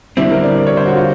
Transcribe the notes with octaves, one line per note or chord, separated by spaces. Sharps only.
D3 G3 C4 E4
A#4
D5
D5
C#5
C5
F#4
F4